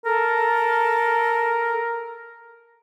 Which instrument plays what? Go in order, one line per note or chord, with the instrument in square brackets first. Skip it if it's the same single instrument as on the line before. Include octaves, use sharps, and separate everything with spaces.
[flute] A4 [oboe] A#4